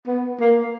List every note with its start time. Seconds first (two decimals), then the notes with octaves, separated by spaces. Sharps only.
0.07 B3
0.40 A#3